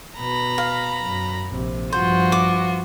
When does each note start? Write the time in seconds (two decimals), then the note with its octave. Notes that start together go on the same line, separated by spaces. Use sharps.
0.19 B2 A#5 B5
0.58 F5
1.03 F#2
1.51 A#1 C3
1.92 G2 F3 F4 F#4 C5
2.32 D6